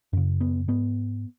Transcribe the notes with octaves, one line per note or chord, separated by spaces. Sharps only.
F#2 C#3
B3
G#2 B3